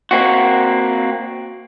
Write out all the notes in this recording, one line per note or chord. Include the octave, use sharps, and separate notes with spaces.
A#3 C4 F#4